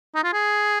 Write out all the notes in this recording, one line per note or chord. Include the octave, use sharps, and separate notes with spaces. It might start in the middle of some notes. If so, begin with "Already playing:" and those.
D#4
F4
G#4